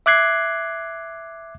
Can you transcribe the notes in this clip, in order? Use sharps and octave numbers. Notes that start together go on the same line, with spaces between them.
E5 D6 F#6 G#6 C7